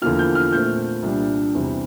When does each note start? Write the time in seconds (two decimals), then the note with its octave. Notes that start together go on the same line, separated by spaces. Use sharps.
0.02 E2 D3 F3 A#3 F4 F6
0.19 G6
0.35 F6
0.53 A#2 A3 C4 G6
1.03 C2 A#2 G3 D4
1.55 E2 C3 G3